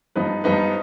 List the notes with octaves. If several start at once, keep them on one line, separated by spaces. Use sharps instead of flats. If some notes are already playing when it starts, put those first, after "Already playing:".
G2 F3 B3 D#4 B4
G2 F3 B3 D#4 B4